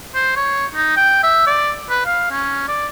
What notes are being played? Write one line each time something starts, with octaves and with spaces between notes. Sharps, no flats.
C5
C#5
D#4
G5
E5
D5
B4
F5
C#4
D5